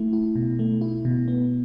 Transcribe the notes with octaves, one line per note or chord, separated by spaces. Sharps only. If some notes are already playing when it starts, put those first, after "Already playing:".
Already playing: A3 E4
E4
B2
A3
E4
B2
B3